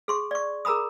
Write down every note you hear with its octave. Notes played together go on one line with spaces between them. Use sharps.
G#4 C6 C#6
D5 C#6
G#4 A#4 A#5 B5 D#6